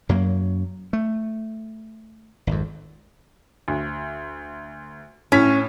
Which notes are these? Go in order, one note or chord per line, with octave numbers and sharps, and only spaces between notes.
F#2 F#3 A#3
A3
G#1 F2
D2
A2 C#4 B6